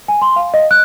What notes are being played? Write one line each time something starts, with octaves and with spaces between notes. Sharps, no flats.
G#5
C6
F5
D#5
F#6